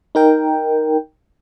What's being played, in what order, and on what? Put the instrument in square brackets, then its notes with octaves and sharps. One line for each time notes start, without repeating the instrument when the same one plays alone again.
[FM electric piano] D#4 A#4 G5